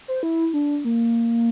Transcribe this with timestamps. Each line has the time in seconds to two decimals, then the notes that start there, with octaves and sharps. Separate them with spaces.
0.08 C5
0.23 E4
0.54 D4
0.85 A#3